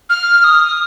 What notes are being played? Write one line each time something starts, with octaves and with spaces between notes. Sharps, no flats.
F6
D#6